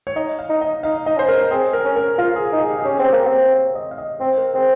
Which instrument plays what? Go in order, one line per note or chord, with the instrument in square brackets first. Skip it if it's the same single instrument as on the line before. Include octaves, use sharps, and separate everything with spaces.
[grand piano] C#5
[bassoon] D#4 [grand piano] D#5
[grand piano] F5
[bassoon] D#4
[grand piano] D#5
[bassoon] D#4 [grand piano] F5
[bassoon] D#4 [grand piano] D#5
[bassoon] C#4 [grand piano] C5
[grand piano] A#4
[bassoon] C4 [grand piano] G#4
[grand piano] A#4
[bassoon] C#4
[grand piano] A#4
[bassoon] F4 [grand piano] A#4
[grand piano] G#4
[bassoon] D#4
[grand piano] G#4
G4
G#4
[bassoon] C#4 [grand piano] G4
[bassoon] C4
[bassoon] A#3 [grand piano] G4
[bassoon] C4
[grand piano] C#5
D#5
F5
D#5
[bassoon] C4 [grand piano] C5
[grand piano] A#4
[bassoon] C4 [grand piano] G#4